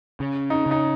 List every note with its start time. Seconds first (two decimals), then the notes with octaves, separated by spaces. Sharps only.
0.20 C#3
0.50 D#4
0.66 C#3 D#4